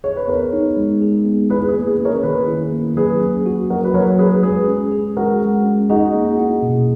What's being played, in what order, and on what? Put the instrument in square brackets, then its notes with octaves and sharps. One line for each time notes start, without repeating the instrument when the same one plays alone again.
[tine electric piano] G#4 [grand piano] C#5
[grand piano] B4
[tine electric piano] B3 [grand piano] A#4 C#5
[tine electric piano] D#4
G#3
G#4
B3
[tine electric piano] E4 [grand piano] G#4 B4
[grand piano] G#4 B4
[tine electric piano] A#3
[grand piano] G#4 B4
[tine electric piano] C#4
[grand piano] A#4 C#5
[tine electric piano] D#3 [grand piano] G#4 B4
[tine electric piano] E4
A#3
[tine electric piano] F#3 [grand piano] G#4 B4
[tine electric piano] C#4
F#4
[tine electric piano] F#3 [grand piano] F#4 A#4
[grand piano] B4
[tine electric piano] F#3 [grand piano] A#4 C#5
[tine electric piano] C#4 [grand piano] G#4 B4
[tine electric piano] G#3 [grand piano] G#4 B4
[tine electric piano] C#4
G#4
[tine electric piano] G#3 [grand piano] F#4 A#4
[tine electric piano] G#3
C#4
[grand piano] D#4 F#4 [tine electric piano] G#4
[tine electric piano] A#3
E4
B2